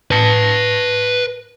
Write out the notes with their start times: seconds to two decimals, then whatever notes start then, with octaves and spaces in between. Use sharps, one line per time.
0.11 B4 A5